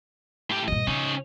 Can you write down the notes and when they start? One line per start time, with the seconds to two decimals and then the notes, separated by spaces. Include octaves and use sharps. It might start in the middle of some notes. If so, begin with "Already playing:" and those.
0.50 A2 G4
0.68 G2 A#2 D#5
0.87 C#3 C#4 D#4